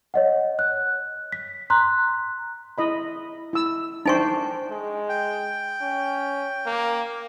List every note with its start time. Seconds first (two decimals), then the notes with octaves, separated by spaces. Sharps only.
0.14 C#5 D#5 F#5
0.59 F#6
1.32 B6
1.70 A#5 C6 F#6
2.78 E4 D#5 B5
3.53 E4 E6
4.06 D4 D#4 C5 G5 G#5 C#6
4.70 G#3
5.09 G5
5.81 C#4
6.66 A#3